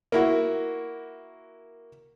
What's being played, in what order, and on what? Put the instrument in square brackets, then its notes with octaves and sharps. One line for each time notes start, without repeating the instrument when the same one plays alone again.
[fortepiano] A#3 E4 F#4